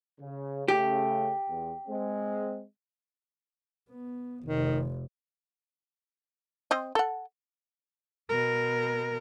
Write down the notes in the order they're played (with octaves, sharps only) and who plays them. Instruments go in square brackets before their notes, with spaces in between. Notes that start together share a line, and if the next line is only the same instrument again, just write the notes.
[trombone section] C#3
[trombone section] C#3 A3 [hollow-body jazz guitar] G4
[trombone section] E2
G#3 C4
[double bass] B3
[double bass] F1 [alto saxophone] D#3
[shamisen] C4 C5 D#5
A4 F#5
[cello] B2 A#4